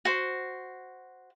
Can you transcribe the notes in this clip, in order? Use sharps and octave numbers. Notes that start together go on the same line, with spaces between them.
F#4 C5